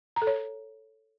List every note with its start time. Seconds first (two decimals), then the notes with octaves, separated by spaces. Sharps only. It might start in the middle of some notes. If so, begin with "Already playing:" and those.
0.16 A#5
0.22 A4
0.27 C#5